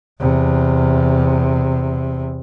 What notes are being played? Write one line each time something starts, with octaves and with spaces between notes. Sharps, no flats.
E2 C3